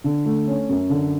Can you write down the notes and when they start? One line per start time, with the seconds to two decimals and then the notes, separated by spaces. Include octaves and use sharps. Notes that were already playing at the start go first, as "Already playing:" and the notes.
0.04 D3
0.25 A3
0.48 C#4
0.69 F#2
0.90 D3